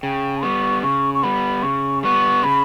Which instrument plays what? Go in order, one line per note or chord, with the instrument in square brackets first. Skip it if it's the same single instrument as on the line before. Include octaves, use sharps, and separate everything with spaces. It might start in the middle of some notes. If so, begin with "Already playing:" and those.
[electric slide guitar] C#3 [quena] G5
[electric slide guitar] G3 B3 [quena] C#6
[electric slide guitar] C#3 [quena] C#6
[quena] C#6
[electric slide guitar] G3 B3 [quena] B5
[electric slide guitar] C#3 [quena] C#6
[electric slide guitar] G3 B3 [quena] C#6
[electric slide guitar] C#3 [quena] B5